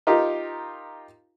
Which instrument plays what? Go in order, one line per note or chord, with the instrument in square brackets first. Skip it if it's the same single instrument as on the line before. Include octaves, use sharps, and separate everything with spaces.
[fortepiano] D#4 F4 G4 A#4